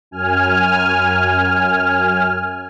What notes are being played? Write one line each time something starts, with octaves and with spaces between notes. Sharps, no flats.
F#2 G#5 F6